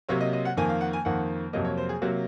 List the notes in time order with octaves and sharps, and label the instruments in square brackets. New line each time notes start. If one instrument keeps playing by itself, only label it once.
[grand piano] C3 F#3 A#3 C#5
D#5
D#5
F#5
F2 D#3 A#3 G#5
F5
F#5
G#5
F2 D#3 A#3 F#5
F2 C3 F#3 A#3 D#5
C#5
C5
G#4
C3 F#3 A#3 F#4